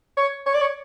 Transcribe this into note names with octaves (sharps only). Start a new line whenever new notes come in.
C#5
C#5
D5
C#5